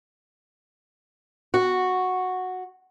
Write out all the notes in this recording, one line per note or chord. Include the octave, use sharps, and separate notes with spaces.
F#4